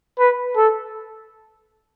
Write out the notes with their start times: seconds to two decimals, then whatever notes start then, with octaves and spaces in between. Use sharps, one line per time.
0.19 B4
0.56 A4